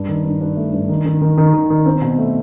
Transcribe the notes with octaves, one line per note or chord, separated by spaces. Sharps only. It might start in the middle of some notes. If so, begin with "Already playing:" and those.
Already playing: G2
D#3
G2
G2
A3
G2
D#3
D#3
D#3
D#3
D#3
D#3
C4
B2
A3